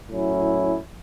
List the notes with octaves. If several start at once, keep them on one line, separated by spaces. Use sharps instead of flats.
A2 F#3 C#4 E4